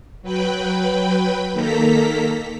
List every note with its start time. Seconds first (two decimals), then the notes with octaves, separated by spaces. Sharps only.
0.22 F#3 B4 G5 B5
1.53 D#3 A#3 A4 A#5 B6